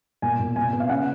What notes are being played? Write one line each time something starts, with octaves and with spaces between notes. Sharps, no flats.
A#2 G#5
A#2
C3 G#5
B3
F5
C#3 F#5